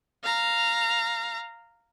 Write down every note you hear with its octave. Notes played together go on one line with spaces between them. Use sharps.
F5 A#5